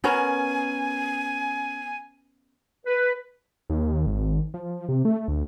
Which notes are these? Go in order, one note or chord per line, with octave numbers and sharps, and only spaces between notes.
B3 C#4 A#4 G#5
B4
D#2
G#1
F3
C3
A3
D2